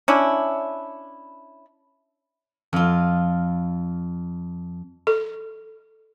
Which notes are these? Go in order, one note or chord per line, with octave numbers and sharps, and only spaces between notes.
C#4 D4 E4
F2 F4
A4